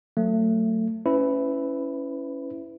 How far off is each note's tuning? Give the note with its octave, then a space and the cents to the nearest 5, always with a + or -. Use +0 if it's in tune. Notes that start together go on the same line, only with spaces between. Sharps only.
F#3 +0 A3 +25
C#4 +0 E4 +0 B4 +30